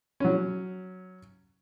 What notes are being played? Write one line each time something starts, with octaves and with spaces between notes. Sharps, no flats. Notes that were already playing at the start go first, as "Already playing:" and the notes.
F#3 C#4